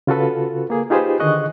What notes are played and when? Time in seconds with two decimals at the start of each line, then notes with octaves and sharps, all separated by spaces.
0.07 C#3 F4 F#4 A4 B4
0.70 A#3 G#4
0.90 D#4 F4 G4 G#4 B4 C5
1.20 D3 D#3 G#4 D#5 C#6 F#6